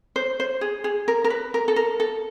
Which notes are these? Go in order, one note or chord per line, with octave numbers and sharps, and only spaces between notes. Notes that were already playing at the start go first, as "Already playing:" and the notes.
C5
C5
G#4
G#4
A#4
A#4
B4
A#4
A4
A#4
A4